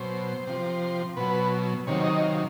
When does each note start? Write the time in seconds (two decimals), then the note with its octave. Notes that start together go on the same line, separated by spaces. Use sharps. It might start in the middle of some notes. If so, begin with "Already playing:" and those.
Already playing: B2 F#3 C5
0.47 C3 F3
1.17 B2 F#3 B4
1.87 C3 D#3 F#3 C#5
2.04 D#5
2.22 F5